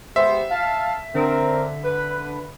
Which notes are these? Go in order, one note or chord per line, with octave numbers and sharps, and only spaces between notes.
G#3 B3 G4 C5 E5
F5 A5
D3 C4 A#4
B4